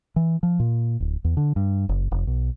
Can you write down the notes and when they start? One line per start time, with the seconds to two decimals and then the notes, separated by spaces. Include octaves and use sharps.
0.16 E3
0.43 F3
0.60 A#2
1.00 D1
1.24 E2
1.37 D3
1.56 G2
1.89 F#1
2.11 F1
2.27 B1